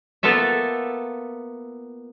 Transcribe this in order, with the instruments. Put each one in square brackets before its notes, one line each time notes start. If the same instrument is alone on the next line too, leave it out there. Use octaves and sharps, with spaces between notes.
[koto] A#3 B3 F4 A4 E5